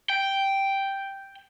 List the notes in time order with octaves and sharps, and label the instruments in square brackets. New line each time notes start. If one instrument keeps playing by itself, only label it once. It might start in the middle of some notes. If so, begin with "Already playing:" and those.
[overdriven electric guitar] G5